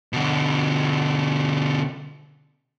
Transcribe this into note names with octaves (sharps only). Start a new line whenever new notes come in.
B2 D3